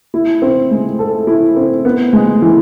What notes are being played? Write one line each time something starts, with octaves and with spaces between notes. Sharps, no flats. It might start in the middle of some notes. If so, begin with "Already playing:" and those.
E4
C4
G#3
A4
E4
C4
B3
G#3
E3